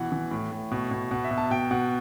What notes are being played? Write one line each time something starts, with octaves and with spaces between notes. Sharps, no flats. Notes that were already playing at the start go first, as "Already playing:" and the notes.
Already playing: B2 E3 F#5
E3
A2
A2
B2
B2
B2 F#5
E5
B2
A5
B2 G5
B2 F#5